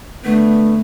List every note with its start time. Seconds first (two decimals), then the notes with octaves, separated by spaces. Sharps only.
0.25 D3 A3 B3